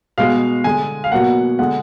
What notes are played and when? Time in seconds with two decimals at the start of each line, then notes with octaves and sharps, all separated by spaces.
0.18 B2 G#3 F5
0.64 D3 G#3 G#5
1.04 F5
1.12 B2 F#3 A#3 F#5
1.59 D3 G#3 F#5